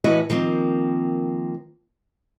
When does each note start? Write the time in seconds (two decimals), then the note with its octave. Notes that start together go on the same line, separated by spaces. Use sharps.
0.04 A2 E3 C#4 F#4 B4 D#5
0.30 D#3 F3 A#3 C4